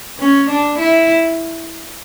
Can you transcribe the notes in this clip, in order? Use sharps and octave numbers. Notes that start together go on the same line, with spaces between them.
C#4
D4
E4